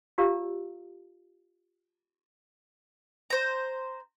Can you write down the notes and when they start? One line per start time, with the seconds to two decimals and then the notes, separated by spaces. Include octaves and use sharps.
0.18 F4 G4 D5 F5 A#5 E6
3.30 C5 A#5